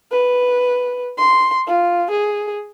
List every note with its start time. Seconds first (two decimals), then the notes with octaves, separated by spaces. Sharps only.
0.12 B4
1.18 C6
1.67 F4
2.11 G#4